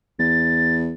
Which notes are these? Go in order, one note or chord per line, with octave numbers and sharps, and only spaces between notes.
E2 A6